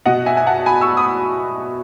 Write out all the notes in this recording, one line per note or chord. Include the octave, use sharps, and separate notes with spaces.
B2 D#5 F#5
E5 G#5
G#5
F#5 A5
G#5 B5
C#6 E6
B5 D#6